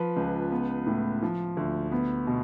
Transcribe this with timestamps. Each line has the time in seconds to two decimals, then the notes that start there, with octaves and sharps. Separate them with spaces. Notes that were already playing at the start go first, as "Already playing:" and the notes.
Already playing: F3 B4
0.16 C#2
0.52 B3
0.86 A2
1.22 F3
1.57 D2
1.92 B3
2.27 B2